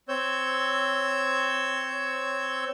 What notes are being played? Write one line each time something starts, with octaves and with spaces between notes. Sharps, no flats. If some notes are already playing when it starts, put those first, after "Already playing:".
C4 C#5 E6 G6